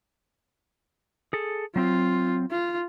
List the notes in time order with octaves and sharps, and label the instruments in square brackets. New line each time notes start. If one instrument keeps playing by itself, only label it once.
[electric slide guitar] G#4 A4
[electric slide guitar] F#3 C4 [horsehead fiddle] F4
[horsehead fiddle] F4